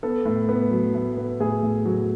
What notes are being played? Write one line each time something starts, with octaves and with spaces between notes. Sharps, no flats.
B3 A4
A2
B3
F#3
A2
B3
A2 G#4
A2
F#3